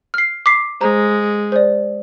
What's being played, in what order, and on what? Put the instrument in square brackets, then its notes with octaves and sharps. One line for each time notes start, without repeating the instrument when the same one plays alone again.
[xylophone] F6 C7
D6 B6 C7
[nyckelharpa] G#3 [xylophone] C5 A#5
[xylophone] C5 D5